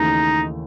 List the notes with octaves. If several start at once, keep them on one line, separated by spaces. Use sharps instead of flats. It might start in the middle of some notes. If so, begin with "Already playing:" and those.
Already playing: D#2 C#3 E3 A3 D#4